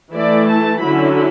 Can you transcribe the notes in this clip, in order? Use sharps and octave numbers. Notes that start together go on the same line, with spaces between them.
E3 A3 E4 D5
A5
D3 F#3 C#4 E4 B5